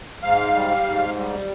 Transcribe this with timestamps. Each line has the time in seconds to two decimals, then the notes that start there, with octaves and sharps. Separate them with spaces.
0.23 G#2 F5
0.54 G3
0.86 G#2
1.17 G3